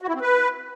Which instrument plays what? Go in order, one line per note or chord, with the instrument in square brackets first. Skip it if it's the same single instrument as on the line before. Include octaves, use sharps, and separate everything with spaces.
[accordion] F#4
E4
C4
B4